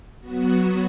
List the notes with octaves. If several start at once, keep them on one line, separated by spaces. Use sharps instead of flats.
F#3 B3 F#4